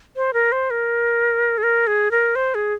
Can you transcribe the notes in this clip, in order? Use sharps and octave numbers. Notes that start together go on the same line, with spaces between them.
C5
A#4
C5
A#4
G#4
A#4
G#4
A#4
C5
G#4